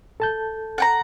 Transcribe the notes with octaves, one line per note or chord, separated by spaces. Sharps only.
A4 A5 G6
F#5 G5 A#5